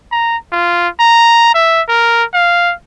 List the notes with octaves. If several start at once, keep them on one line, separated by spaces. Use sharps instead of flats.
A#5
F4
A#5
E5
A#4
F5